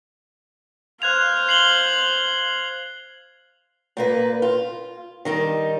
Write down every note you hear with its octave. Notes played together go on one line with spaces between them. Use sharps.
C5 F5 F#6 G#6 F7
C7 F#7 G7
A#2 A#3 B4
F4
D#3 G3 D#4